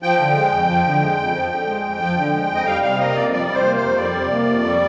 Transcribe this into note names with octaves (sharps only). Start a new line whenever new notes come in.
F3 G5
D3
G#3
F2
F3
D3
G#3
F2
F3
D3
G#3
F2
F3
D3
G#3
F2
D#5
G3 F5
C3 F5
A#3 D#5
F2 D5
G3 D5
C3
C5
A#3
C5
F2
G3 D5
C3
A#3
F2
G3